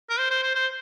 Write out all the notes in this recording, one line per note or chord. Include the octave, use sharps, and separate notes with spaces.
A#4
C5
C5
C5
C5